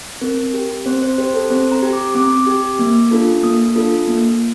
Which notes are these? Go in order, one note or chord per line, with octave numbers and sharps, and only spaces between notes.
C4 A#4
G4
C4 C5
C5
G4 C5
A4
C4 C5
A#5
G4
D6
C4 D6
G4
A#3
D4 F4 A4
A#3 D#6
D4 F4 A4
A#3